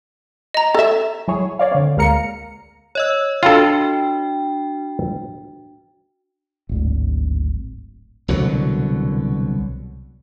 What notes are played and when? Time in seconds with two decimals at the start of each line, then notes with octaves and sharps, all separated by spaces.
0.54 D#5 A#5
0.74 A4 E5
1.28 F#3 E4 G#4 C#5
1.59 C#5 D5 F5
1.72 D3 C4
1.97 D2 G#3 A#3 F5 A#5 C#7
2.95 C#5 D#5 E6
3.43 D4 F4 F#4 A4 G5
6.69 D1 G#1
8.28 C2 B2 D3 F#3